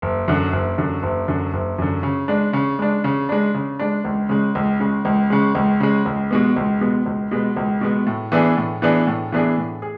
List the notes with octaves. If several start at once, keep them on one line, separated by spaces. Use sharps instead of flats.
F#1
F#2 D3
F#1
F#2 D3
F#1
F#2 D3
F#1
F#2 D3
C#3
G#3 D4
C#3
G#3 D4
C#3
G#3 D4
C#3
G#3 D4
C#2
C#3 G#3
C#2
C#3 G#3
C#2
C#3 G#3
C#2
C#3 G#3
C#2
B2 G#3 B3
C#2
B2 G#3 B3
C#2
B2 G#3 B3
C#2
B2 G#3 B3
A2
E3 B3 D4 G#4
A2
E3 B3 D4 G#4
A2
E3 B3 D4 G#4
A2
G#4